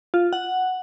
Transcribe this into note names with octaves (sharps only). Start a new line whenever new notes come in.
F4
F#5